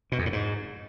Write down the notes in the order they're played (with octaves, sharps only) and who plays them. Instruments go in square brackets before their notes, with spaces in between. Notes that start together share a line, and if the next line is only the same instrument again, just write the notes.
[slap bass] B2
F2
A2
G#2